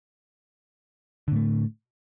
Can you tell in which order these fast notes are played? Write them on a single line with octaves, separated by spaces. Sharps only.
D3 A2 A3